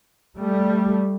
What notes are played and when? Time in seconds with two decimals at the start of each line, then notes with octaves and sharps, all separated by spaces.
0.37 G3 A3